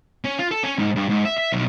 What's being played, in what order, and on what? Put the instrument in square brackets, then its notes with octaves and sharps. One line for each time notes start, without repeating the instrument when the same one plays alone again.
[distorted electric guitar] C#4
F4
A4
C#4
G#2
G2
G#2
E5
E5
B1